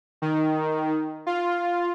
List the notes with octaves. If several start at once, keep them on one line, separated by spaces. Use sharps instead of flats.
D#3
F4